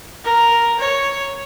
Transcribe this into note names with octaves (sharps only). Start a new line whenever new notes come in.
A#4
C#5